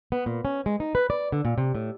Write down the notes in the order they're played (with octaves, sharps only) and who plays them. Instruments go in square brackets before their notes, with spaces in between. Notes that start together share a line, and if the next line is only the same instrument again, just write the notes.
[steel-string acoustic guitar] B3
A#2
C#4
G#3
D#4
B4
D5
D3
A#2
C3
A2